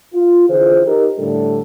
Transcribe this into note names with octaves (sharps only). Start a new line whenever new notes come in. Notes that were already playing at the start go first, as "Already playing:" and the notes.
F4
D3 E3 F4 G#4 C5
D#4 G4 A#4
A2 D3 G3 D4 A4